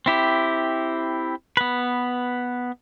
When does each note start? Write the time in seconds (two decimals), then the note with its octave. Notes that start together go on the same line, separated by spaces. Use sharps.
0.06 C4 E4 G4
1.57 B3 B4